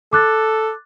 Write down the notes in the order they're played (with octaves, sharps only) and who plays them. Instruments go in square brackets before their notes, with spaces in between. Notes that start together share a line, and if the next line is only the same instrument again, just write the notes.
[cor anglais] A4 [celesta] D6 F#6 A6